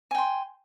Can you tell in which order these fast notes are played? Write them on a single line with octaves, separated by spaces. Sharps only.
G#5 G5 C6